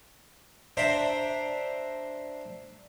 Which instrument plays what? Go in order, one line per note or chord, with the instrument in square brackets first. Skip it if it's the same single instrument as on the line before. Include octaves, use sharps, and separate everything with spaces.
[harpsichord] D4 C5 E5 A#5 C6